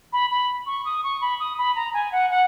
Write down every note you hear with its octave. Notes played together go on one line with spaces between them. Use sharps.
B5
B5
C#6
D#6
C#6
B5
D#6
B5
A#5
G#5
F#5
F#5